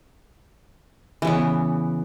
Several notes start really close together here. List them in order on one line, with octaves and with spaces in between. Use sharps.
E3 C#3 B3